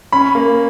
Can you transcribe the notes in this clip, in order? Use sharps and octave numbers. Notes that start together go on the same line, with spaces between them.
C#4 B5
A#3